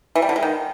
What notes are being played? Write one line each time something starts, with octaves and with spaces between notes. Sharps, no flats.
E3
G3
D3
G#3
D#3